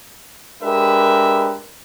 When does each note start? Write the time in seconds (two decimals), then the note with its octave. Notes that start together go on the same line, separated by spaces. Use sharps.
0.63 G#3 D4 G4 A#4 B4 E5